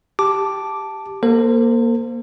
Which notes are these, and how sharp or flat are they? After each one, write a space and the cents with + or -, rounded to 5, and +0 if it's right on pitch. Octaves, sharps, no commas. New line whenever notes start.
G4 +0 A5 +0 D6 +0
A#3 +15 A4 +45 C5 -20